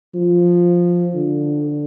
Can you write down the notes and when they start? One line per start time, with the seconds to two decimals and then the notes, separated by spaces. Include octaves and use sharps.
0.14 F3
1.15 D3